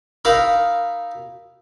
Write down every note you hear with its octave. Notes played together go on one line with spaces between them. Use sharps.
D#4 A#4 E5 F5 A#5 B5